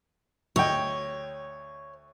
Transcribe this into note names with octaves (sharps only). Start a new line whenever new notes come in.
D2 C#5 D#5 G5